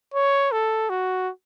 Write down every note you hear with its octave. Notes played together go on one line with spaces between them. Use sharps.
C#5
A4
F#4